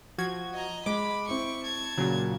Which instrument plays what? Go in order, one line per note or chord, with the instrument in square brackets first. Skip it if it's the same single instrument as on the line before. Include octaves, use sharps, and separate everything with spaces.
[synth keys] F3 F#4 G#6
[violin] D#5 A#5
[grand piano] G#3 [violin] B5 [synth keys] D6
[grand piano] C4 E4 [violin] C#6
[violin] A5 G#6
[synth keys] A#2 C#3 [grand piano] F#3